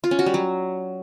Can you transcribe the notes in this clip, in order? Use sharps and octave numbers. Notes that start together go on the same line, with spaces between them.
F4
C#4
F#4
G3
F#3